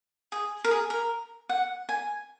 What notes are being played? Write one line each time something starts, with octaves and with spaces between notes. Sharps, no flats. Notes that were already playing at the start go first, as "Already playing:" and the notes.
G#4
A#4
G#4
A#4
F#5
G#5